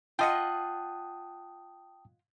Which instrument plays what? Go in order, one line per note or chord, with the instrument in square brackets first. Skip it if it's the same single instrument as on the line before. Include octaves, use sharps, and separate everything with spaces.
[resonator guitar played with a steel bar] F4 D#5 F#5 [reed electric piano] G5 A5 D#6